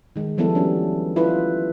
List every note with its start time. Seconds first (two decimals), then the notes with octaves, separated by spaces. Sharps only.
0.16 D#3 G#3
0.37 E3 F3 G3 B3 E4 A4
0.55 C#4 D4 F#4
1.16 E4 F4 B4